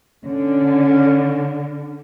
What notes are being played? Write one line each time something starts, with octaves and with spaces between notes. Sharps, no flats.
D3 C#4